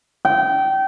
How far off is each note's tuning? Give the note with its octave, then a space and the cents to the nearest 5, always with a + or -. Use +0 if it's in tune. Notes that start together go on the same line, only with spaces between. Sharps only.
G5 -25